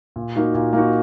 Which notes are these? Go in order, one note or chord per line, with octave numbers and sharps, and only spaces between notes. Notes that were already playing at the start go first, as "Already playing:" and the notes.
A#2
A#3 D#4 F#4
A#2
A#3 D#4 F#4